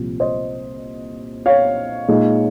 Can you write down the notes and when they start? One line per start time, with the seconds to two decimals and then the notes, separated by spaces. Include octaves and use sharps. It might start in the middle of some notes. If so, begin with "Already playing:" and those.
Already playing: C2 A#2 F3
0.20 C5 D#5
1.46 C#5 F5
2.08 A#2 G#3 D#4